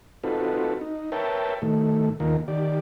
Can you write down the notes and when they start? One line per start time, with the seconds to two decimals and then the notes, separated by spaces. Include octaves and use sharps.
0.24 C4 D#4 F4 F#4 A4 B4
0.81 D#4
1.12 A#4 B4 C#5 E5 G5 A5
1.62 A2 D#3 A3
2.20 D#2 D#3 A#3 F4 A#4
2.48 D#3 G4 D5